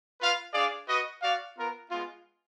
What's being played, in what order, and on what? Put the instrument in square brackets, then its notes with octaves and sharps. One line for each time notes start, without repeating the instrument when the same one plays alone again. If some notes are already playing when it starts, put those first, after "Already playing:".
[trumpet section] F4 B4 F5
D4 G#4 D5 F5
F#4 B4 D#5
F#4 D5 F5
B3 F4 A#4
G#3 B3 F4